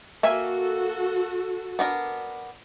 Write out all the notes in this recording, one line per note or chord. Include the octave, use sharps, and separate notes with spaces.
A#3 F#4 A4 E5 G#5
B3 D4 A#4